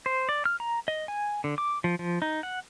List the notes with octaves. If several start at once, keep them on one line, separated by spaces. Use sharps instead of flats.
C5
D5
F6
A#5
D#5
G#5
D3
D6
F3
F3
D#4
F#5